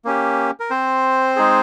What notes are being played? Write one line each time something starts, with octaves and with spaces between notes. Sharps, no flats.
A#3 C#4 G4
A#4
C4 C5
G#3 D#4 G#4